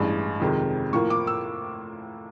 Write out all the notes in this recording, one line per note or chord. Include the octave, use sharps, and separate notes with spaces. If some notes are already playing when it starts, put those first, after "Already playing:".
Already playing: A1 G2 E3 G#3
F2 C3 D#3 G#3
A2 F3 A#3 C#6
D6
E6